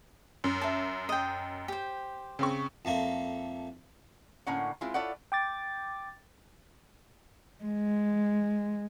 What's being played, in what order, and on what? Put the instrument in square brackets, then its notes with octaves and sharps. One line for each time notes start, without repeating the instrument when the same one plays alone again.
[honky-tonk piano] F#2
[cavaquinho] E5 A5
D#5 G5
G4 C5
[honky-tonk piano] C#3 C4 C#6
[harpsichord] F2 A3 A#3
[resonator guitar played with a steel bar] A2 D3 A#3 C#4 F#5
G#3 C4 E4 F4
E4 F4 A4 C#5 D5 F#5
[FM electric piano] G5 D6 A6
[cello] G#3